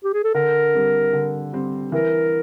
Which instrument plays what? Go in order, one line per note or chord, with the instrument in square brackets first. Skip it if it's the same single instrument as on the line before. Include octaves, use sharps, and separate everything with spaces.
[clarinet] G4
G#4
A4
[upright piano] D3 [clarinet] A#4
[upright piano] G3 C4
D3
G3 C4
[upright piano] E3 [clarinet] A#4